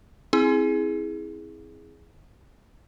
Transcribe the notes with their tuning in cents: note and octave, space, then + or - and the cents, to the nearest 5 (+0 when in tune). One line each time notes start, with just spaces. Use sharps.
C4 +0 E4 -20 G#4 +0